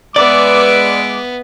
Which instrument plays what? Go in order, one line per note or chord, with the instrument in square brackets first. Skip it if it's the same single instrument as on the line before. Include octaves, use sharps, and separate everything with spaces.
[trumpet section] G#3 D6 [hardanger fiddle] B3 [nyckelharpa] B4 E5 [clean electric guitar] D5